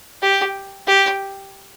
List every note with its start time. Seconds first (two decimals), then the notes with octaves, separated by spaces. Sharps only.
0.22 G4
0.87 G4